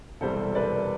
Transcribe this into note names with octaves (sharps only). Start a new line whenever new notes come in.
E1 E2 C3 G3 A4 C5
B4 D5